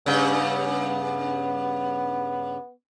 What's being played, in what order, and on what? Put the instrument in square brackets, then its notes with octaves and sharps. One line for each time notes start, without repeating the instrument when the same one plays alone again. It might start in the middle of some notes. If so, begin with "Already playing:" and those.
[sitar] G2 C#3 [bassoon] B3